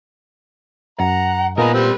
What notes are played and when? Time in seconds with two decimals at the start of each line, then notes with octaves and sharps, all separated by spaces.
1.00 F#2 F#5 A#5
1.58 A#2 A#3 B3 A#4 D#5 G#5 A#5 B5
1.74 G3 C4 C5